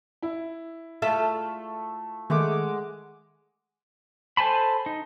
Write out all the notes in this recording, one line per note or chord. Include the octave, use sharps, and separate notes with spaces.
E4
A3 F4 A4 E5
D#3 G#3 A3 F#5 D6
A4 C5 G#5 A5 B5
D#4